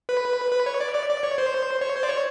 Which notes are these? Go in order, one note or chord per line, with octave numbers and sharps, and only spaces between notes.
B4
B4
C#5
D5
D5
D5
C#5
C5
C#5
C5
D5
C#5